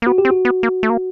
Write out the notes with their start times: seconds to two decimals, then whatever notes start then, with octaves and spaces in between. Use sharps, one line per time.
0.02 A#3
0.06 B3 F#4
0.18 G4
0.25 C4
0.30 F#4
0.45 B3
0.63 A#3
0.83 A3
0.90 A#3